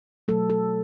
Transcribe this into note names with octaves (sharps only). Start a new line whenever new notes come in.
B2 F#3 A3 A4
A4